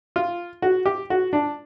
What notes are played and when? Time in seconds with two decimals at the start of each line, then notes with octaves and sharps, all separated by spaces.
0.16 F4
0.62 F#4
0.86 G4
1.10 F#4
1.33 D4